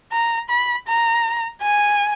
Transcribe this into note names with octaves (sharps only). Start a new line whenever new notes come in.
A#5
B5
A#5
G#5